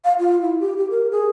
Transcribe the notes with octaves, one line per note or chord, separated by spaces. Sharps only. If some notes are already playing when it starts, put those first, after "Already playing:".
F5
F4
E4
G4
G4
A#4
G#4